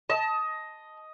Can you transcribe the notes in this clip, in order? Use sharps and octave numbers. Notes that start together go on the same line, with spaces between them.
D#5 A5